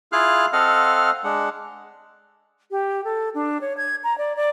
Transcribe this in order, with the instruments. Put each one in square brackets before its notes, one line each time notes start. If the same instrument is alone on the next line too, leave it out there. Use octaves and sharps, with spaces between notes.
[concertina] E4 F4 G#4 F5 F6 F#6
C4 A4 D#5 F5 F#5 F6
G#3 D4 F#5
[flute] G4
A4
D4
C#5
G#6
A#5
D5
D5